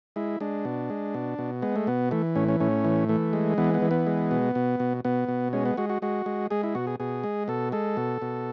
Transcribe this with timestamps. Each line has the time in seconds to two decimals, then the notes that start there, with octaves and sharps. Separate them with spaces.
0.16 G#3 E4
0.40 G#3 D4
0.65 B2
0.90 G#3
1.14 B2
1.39 B2
1.62 G#3 B3
1.76 A3
1.87 B2 B3
2.11 E3 A3
2.36 A2 C#4
2.48 C#4
2.60 A2 C#4
2.85 E3
3.09 E3 A3
3.33 G#3
3.58 E3 B3
3.74 B3
3.82 E3
3.91 B3
4.07 G#3
4.31 B2
4.55 B2
4.80 B2
5.05 B2 B3
5.28 B2
5.53 G#3 C#4
5.65 B3
5.77 G#3 F#4
5.89 F#4
6.02 G#3 F#4
6.26 G#3
6.51 G#3 G#4
6.63 E4
6.75 B2 F#4
6.87 G#4
7.00 B2 G#4
7.23 G#3
7.48 B2 A4
7.72 G#3 A4
7.97 B2
8.22 B2